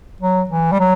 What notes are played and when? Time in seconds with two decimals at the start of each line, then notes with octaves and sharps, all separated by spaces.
0.21 F#3
0.50 E3
0.72 G3
0.80 F#3